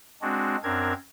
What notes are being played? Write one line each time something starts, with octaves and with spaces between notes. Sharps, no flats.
G#3 C4 D4 F#4
F#2 C4 D4 A#4 G#6